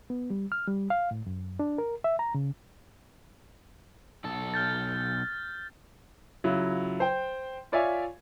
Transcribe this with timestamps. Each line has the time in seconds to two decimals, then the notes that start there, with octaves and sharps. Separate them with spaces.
0.10 B3
0.30 G3
0.52 F6
0.67 G3
0.90 F5
1.11 A2
1.26 F#2
1.59 D4
1.78 A#4
2.04 E5
2.19 A#5
2.34 C#3
4.25 B1 A4
4.54 F6 G6 A6
6.44 C#3 F#3 E4 F4
7.00 C5 G5
7.72 F4 C#5 D5 E5 F5 G#5